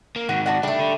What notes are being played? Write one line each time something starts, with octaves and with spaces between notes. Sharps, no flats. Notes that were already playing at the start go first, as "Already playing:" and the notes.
A#3
G#2 D#3 F#4
D4 F#4 F#5
G3 A3 D4
D3